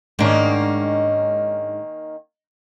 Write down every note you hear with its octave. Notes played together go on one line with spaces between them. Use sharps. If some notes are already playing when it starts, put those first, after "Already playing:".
G#2 D#3 A#3 C#4 D4